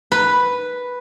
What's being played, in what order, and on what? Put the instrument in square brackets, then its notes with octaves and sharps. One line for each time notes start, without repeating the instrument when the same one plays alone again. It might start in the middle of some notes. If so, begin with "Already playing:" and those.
[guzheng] B4